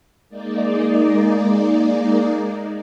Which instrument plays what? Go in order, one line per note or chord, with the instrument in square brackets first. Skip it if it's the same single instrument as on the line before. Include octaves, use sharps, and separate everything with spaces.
[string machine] G#3 A#3 D#4 D5